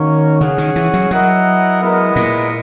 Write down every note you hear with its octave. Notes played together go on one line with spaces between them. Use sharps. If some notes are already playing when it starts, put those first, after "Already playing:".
Already playing: D#3 A#3 C#4 F#4 A#4 C#5
C#3 C#4 G#4 C#5 F#5
D#3
E3
F#3
F#3 E4 A#4 D#5 F#5
G#3 B3 E4 A#4 D#5
A#2